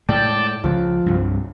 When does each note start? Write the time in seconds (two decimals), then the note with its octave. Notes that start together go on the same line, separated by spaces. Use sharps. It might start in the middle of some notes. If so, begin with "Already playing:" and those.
0.09 A2 G#3 D5 G5 A5
0.64 C#2 C#3 F3
1.06 C2 G2